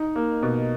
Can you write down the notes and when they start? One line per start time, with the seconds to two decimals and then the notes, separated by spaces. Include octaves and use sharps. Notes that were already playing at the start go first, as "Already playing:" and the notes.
Already playing: D#4
0.16 A#3
0.43 B2